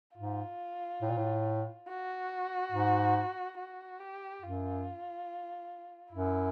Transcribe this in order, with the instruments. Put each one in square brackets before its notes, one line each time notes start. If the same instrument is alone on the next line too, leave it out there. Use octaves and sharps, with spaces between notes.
[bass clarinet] G#2 [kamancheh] F4
[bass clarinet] A2
A#2
A2
[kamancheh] F#4
[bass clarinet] G#2
[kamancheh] F#4
G4
[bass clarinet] F#2 [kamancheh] F4
[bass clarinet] F#2 [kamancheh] E4